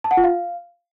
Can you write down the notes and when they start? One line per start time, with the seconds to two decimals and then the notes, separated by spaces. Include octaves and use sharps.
0.04 A5
0.11 F#5
0.17 F4
0.24 F5